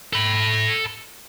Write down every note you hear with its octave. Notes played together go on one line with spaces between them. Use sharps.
A4 B5